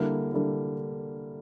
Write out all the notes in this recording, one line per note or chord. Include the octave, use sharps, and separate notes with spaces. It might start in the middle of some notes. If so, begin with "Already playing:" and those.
Already playing: D3 G3 A#3 E4
D3 G3 A#3 E4